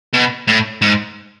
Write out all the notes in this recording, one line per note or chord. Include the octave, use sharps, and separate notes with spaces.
B2
A2
G#2